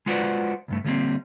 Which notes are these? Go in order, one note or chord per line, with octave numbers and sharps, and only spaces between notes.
G#3 F4 F#4 B4 C5 D5
C#2 G2 A3
D3 F3 G3 A#3 C4